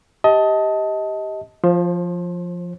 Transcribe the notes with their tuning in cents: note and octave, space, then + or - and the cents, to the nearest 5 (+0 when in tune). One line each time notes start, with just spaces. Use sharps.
G4 +0 D#5 +25 A5 +0
F3 +0 C5 +30